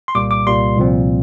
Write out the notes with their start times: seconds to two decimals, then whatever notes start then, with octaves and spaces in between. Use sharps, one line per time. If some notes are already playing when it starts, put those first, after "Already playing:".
0.08 C6
0.15 C2 A#2 G3 A#3 D6
0.31 D6
0.47 C2 A#2 G3 A#3 C6
0.78 C2 A#2 F3 C4